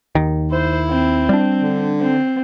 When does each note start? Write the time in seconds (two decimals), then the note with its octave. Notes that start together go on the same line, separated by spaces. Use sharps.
0.15 D#2 D#3
0.51 E4 C5
0.89 C4
1.29 G3 D4
1.62 D3
2.01 C4